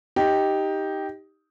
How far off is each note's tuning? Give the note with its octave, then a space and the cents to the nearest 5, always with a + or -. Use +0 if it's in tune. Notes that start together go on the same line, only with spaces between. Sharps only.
D#4 +10 G4 +0